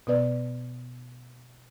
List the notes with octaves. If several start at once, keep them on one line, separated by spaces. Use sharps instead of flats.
B2 B3 B4 D5